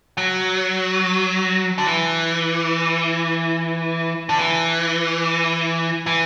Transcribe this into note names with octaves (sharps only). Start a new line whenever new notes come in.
F#3
D3
E3
D3
E3
E3